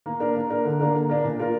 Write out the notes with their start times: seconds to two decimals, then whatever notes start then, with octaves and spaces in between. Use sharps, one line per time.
0.06 A#3
0.20 D4 A#4
0.35 A#3
0.49 D4 A#4
0.65 D3
0.80 A#3 D4 A#4
0.94 D3
1.09 A#3 D4 A#4
1.24 A#2
1.39 A#3 F4 A#4